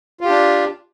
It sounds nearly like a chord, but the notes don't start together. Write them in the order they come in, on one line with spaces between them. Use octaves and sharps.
F4 G4 D4